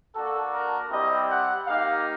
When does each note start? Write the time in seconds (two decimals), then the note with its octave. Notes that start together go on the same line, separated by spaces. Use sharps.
0.14 A#3 D4 F#4 A4
0.52 A#4
0.90 G3 C4 E4 G4 D#5
1.28 F#5
1.66 A#3 D#4 G4 F5